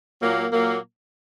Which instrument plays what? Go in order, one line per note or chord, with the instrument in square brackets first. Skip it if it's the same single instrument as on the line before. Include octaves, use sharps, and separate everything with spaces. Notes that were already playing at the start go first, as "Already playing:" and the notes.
[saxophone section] A#2 F#3 A#3
A#2 F#3 A#3